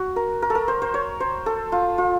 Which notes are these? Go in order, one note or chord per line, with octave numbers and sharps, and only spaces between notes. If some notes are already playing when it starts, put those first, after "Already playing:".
Already playing: F#4
A#4
A#4
A4
A#4
C5
C5
C#5
C5
A4
F4
F4